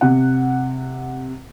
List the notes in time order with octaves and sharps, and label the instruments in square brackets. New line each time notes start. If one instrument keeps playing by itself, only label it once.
[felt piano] C3 F#5